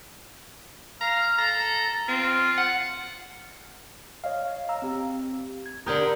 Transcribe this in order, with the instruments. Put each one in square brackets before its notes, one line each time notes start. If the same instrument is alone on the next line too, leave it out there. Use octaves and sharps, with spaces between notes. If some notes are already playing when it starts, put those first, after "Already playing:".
[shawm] F5 [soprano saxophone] A#5
[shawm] A4 [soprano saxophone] A#5
[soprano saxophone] C4 [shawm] F4
[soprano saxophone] F#5
[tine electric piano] C#5 D#5 F5
F5 A#5 E6
C4 G4
G#6
[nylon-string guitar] D3 G4 A#4 [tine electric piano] A#5 D#6 G6